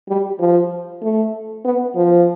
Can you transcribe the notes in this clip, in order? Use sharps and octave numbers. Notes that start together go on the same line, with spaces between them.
G3
F3
A3
B3
F3